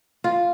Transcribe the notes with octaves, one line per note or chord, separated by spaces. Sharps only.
F4